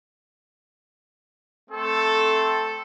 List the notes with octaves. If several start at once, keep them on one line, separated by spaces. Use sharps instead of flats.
A3 C4 A4